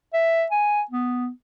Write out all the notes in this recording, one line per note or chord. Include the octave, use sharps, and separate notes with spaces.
E5
G#5
B3